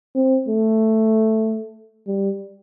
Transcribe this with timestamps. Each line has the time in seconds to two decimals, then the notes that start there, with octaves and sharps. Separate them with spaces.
0.15 C4
0.48 A3
2.07 G3